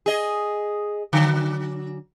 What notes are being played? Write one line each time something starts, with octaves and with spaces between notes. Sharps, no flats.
G#4 D#5
D3 F#3